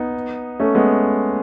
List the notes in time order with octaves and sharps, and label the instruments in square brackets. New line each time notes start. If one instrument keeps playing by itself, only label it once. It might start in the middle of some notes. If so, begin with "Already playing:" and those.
Already playing: [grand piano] B3 D#4
A3 C#4
G#3 B3